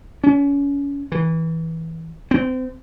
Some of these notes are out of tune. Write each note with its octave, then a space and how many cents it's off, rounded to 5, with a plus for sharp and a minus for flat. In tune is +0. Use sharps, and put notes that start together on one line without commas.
C#4 +30
E3 -20
C4 -30